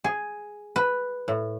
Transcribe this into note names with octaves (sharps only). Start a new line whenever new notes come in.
G#4
B4
A2